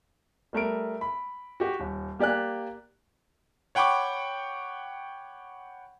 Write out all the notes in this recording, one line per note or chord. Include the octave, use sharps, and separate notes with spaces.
G3 A3 A#4 D7
B5
F#4 G4
D#1
A#3 G4 D5 G#5 F#6
C#5 F#5 G5 B5 C#6 D6